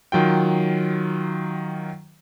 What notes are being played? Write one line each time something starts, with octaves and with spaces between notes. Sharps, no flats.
D#3 F#3 F4 G5